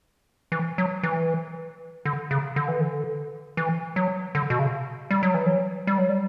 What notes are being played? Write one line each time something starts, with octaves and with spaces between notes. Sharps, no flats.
E3
F#3
E3
D3
C#3
D3
E3
D3
E3
F#3
D3
B2
C#3
G3
F#3
E3
F#3
G3
F#3
G3